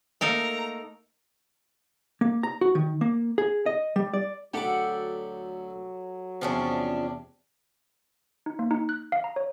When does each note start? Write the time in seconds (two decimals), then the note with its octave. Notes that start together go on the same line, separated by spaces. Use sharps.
0.21 A3 A#3 D#4 A4 A#4 A#5
2.21 A#3
2.43 A#5
2.61 F#4
2.75 D#3
3.01 A#3
3.38 G#4
3.66 D#5
3.96 G3
4.14 D5
4.54 D2 F#3 G4 A4 F#5 B5 D6
6.41 E2 C3 F3 C#4 D4
8.46 D#4
8.59 A#3
8.71 D#4
8.89 F#6
9.12 F5
9.24 A#5
9.36 C#5